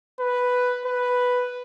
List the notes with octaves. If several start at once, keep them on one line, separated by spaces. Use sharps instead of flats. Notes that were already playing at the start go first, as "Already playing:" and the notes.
B4
B4